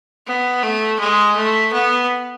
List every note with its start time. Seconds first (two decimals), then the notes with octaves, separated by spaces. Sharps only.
0.26 B3
0.62 A3
0.99 G#3
1.36 A3
1.72 B3